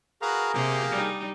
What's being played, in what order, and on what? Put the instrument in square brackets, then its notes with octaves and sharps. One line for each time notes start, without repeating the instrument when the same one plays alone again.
[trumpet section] F#4 B4 F5 [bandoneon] G#4 A#4 A#5
[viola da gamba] C3 [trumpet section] A#3 G4 F5
[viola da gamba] G3 D#4